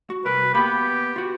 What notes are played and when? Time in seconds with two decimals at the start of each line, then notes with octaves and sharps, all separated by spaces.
0.10 F#4
0.25 C2 A#4 B4
0.54 A#3 B3 G4 B5
1.16 F4 F#4